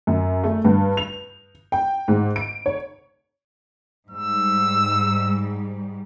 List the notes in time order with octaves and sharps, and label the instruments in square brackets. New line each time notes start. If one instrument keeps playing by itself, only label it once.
[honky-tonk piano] F#2
A3
G2
F7
G5
G#2
D7
C#5
[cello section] G#2 G3 [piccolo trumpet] E6